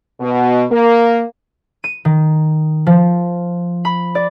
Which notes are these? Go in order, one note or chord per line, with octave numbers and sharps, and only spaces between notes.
B2
A#3
D#7
D#3
F3
B5
D5